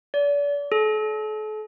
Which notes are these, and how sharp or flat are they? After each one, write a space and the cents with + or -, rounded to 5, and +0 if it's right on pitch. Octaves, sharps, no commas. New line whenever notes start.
D5 -35
A4 -40